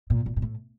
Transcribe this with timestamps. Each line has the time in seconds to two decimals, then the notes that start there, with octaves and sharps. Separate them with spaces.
0.10 A#2
0.26 A#2
0.37 A#2
0.42 A2